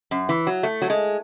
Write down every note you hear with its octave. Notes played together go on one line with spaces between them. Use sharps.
F#2
E3
F#3
A3
F#3
G#3